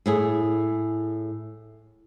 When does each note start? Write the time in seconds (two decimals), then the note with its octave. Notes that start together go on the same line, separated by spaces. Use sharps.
0.06 A2 E4 G#4